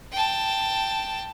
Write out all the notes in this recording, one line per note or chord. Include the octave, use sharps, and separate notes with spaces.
G5 A5